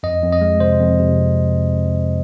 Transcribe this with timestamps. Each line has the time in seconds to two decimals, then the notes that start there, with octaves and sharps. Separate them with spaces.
0.03 F2 D#5
0.23 F2
0.33 D#5
0.41 G#3
0.60 C3 C5
0.80 F2
0.99 C3